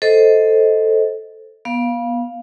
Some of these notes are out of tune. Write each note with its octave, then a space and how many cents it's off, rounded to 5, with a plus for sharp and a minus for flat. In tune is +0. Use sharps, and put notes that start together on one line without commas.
A4 +0 C5 +0 D#5 +15
B3 -30 F5 +0